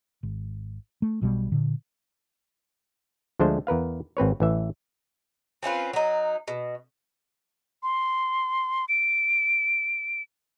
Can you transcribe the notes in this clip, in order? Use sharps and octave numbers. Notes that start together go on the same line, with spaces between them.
G#1
A3
B1 B2 D3 G3
A#2 D3
D2 F3 G#3 A3 D4 C5
E2 A#4 B4 F5
G#1 C4 B4 C#5
A1 E3 E5
C4 C#4 F4 B4
F#3 D#4
B2
C6
D7